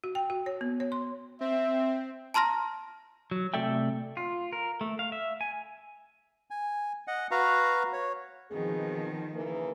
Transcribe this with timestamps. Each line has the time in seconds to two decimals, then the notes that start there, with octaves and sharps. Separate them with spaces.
0.04 F#4
0.15 G5
0.30 F#4
0.46 C#5
0.61 B3
0.80 C#5
0.92 C6
1.41 C4 E5
2.34 A5 A#5 C6 F6 A#6
3.31 F#3
3.54 C3 A3 A4 D5 E5 G5
4.17 F4
4.53 A#4
4.81 A3
4.99 F5
5.12 E5
5.41 G#5
6.50 G#5
7.08 D#5 F#5
7.31 F#4 B4 F5 A#5
7.93 C#5
8.51 B2 D#3 F3 C4 G#4
9.34 C#3 E3 A#3